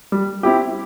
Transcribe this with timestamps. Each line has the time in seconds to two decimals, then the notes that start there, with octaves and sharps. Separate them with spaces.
0.12 G3
0.43 C4 E4 G4